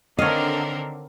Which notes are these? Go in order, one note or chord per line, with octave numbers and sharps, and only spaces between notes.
D3 D#3 C4 A4 A#4 C#5 D#5 F5